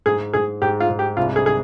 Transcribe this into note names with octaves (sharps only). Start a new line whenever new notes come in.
G#2 G#4
G#2 G#4
G#2 G4
F4
G#2
G4
C2 F4
G#4
G#4